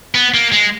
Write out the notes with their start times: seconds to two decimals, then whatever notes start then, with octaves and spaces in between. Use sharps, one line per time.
0.15 B3
0.34 A#3
0.52 G#3